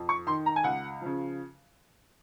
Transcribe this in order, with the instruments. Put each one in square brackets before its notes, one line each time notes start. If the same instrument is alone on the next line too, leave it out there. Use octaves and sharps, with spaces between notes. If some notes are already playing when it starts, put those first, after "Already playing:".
Already playing: [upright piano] F2
C#6
D#3 C6
A#5
G#5
C#2 F#5
C#3 F3